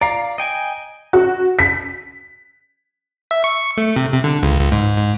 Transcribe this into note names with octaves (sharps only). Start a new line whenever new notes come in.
D5 F5 A#5
D#5 G5 G#5
F#4
B6
E5
C#6
A3
C3
C3
D3
C#2
C#2
G#2
G#2